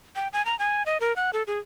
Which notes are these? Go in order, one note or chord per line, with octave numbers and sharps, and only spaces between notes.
G5
G#5
A#5
G#5
D#5
A#4
F#5
A4
G#4